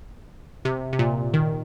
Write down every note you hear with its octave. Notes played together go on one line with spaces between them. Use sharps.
C3
C3
A#2
D#3